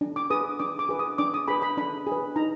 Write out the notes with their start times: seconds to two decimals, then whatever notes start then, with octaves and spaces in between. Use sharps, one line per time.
0.01 D4
0.16 D6
0.30 G#4 B4 D#6
0.60 D4 D6
0.79 D6
0.89 G#4 B4
0.99 D#6
1.18 D4 D6
1.34 D#6
1.48 G#4 B4 B5
1.62 B5
1.77 D4 B5
2.07 G#4
2.12 B4
2.36 D#4 A#5